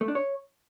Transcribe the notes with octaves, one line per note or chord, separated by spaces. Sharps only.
A3
D4
C#5